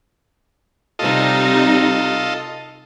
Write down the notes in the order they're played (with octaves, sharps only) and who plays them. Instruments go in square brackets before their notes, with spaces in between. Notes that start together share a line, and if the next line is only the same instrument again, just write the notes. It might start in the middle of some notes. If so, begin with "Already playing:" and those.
[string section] C3 G3 D#4 [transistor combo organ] F4 A4 D#5